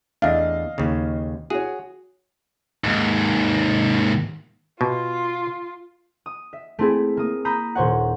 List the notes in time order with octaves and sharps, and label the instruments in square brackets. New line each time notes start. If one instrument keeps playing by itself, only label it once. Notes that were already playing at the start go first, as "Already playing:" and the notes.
[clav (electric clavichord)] E2 A3 D4 [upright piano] D#5 F5
[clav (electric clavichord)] D#2 C#3
[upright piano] F#4 C#5 [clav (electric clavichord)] G#4
[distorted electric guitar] D#2 G#2
[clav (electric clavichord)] B2 [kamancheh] F4
[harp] D#6
E5
A3 C4 E4 G#4
A#3 D#6
A#5 B5 D#6 G6 C7
D#1 A#2 C5 C#5 F#5